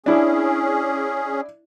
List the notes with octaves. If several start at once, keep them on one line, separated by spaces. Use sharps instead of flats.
C#4 D4 E4 G#4